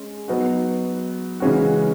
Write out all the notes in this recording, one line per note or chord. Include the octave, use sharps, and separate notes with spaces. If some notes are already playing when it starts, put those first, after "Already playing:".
Already playing: G#3 C#4
F#3 B3 D#4 F#4
C#3 E3 G#3 C#4 F#4